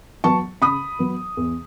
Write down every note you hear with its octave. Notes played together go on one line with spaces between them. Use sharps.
F#3 B3 A5 C#6
C#3 B5 D#6
F#3 B3
E2